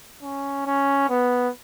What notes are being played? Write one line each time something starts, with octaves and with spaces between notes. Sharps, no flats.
C#4
C#4
B3